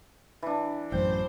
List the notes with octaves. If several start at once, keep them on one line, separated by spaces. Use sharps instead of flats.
E3 D4
A1 F#2 C5 G5